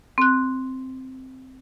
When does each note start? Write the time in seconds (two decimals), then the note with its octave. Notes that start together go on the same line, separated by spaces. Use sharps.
0.18 C4 F#6